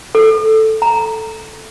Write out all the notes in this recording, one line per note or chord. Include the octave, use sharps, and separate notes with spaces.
A4
A#5